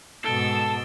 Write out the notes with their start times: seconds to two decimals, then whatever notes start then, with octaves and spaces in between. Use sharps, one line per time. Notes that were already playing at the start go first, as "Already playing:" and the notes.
0.25 G#2 B2 A4 E6 A6 D7 G7